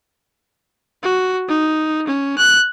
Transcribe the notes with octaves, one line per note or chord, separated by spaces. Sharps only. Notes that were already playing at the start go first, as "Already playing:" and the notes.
F#4
D#4
C#4
F#6